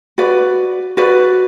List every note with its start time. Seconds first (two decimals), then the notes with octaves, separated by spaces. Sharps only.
0.18 F#4 B4 D5
0.97 F#4 B4 D5